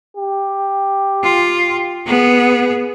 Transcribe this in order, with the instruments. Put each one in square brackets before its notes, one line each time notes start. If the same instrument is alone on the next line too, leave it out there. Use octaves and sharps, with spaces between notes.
[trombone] G4
[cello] F4
B3 G#4